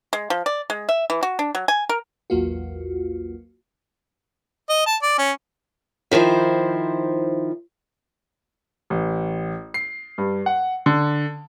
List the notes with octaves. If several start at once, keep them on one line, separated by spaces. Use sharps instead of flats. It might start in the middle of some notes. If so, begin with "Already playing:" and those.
G#3
F3
D5
G#3
E5
E3
F#4
D4
F#3
G#5
A#4
A#1 E2 F#3 A#3 F4 F#4
D#5
A5
D5
C#4
D#3 F3 E4 C5
A1
C7
G2
F#5
D3